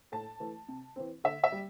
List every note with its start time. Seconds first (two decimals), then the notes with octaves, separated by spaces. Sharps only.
0.12 A2 A5
0.40 E3 A3
0.68 C3
0.96 E3 C4
1.24 D3 E5
1.44 E5
1.52 G3